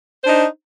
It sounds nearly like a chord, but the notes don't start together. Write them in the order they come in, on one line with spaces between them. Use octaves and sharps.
C5 D4 D#4